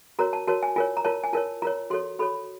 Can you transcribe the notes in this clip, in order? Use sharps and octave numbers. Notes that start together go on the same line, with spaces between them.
F#4 A#4 C#5 A#5
A5
F#4 A#4 C#5 A5
G#5
F4 A#4 C#5 G#5
A#5
F4 A#4 C#5 A5
G#5
F4 A#4 C#5 A5
F4 A#4 C#5 A#5
F#4 A4 C#5 C6
F#4 A4 C#5 B5